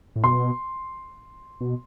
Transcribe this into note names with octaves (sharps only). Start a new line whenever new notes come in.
A2
B2 C6
B2